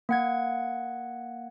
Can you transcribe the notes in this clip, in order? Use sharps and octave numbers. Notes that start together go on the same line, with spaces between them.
A#3 F#5 G#6